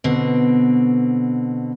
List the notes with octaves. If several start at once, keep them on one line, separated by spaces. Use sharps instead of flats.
B2 D3 C4